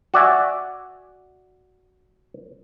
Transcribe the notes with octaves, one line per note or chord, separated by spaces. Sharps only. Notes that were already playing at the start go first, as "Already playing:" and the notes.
F#4 D5 E5 G#5